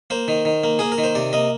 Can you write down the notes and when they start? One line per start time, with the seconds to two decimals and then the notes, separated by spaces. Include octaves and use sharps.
0.10 A#3 C5
0.28 D#3
0.45 D#3
0.64 A#3
0.79 A#3 G#4
0.92 A#4
0.98 D#3
1.03 C5
1.15 C3 D5
1.33 A#3 D#5